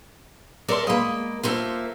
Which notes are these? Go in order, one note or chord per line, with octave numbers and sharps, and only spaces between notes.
A4 A#4 C#5 D5 E5 C6
G#3 A#3 D#5 B5
A3 A#3 F4 C5 E5